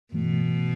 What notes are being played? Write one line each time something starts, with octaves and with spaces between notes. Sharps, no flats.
G2 B2 E3 A3